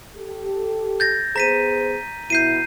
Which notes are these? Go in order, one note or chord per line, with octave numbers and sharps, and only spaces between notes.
G4 A4
G6 A6 A#6
B3 G#4 C5 A#5 B6 D#7
B2 E4 G6 C7 D#7